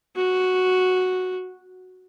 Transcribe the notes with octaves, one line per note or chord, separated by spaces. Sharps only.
F#4